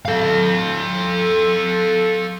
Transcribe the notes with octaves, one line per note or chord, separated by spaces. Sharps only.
A4 F5